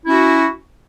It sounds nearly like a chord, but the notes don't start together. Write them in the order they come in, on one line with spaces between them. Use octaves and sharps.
E4 C#4 F#4